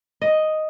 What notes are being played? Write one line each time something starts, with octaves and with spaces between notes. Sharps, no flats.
D#5